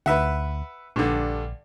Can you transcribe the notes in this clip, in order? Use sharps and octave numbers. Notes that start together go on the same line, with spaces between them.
D2 B4 E5 F#5
A#1 G2 D3